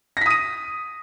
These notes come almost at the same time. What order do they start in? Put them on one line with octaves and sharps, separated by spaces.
A#6 B6 D#6 D#7